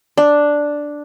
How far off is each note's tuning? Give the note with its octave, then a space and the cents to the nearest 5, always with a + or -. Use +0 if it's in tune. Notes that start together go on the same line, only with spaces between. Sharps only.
D4 +0